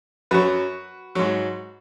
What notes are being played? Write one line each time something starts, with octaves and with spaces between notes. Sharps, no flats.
F#2 F#3 F#4 B4
G#2 F#3